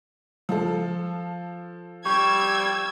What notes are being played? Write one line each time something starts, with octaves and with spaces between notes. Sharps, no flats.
F3 F4 A4
G3 C#6 E6 G#6